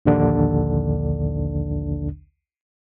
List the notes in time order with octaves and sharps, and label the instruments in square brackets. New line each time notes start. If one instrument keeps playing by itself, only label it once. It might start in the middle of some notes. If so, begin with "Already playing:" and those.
[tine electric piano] A#1 D#2 D3 D4